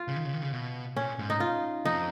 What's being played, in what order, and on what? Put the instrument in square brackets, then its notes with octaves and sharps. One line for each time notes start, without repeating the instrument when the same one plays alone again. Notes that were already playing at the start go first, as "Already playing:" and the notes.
Already playing: [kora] F4
[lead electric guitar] C#3
D#3
C#3
D#3
C#3
B2
[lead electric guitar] A#2 [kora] C#4
[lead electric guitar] G#2
[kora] D#4
F4
[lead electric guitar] F2 [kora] D#4